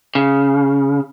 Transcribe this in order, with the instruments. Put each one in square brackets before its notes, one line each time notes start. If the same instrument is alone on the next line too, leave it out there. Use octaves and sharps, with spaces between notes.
[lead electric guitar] C#3